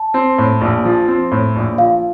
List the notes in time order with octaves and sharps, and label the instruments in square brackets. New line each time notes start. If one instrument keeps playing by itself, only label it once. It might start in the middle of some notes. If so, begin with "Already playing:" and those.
Already playing: [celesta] A5
[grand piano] C4
A2
A#1
F3
C4
A2
A#1
[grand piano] F3 [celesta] F5